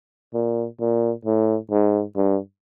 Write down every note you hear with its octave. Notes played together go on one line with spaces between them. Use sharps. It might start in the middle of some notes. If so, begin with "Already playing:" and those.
A#2
A#2
A2
G#2
G2